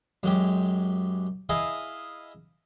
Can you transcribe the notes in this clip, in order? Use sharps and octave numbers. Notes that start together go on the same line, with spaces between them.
F#2 G#3 G4
E4 G#4 D#5 F5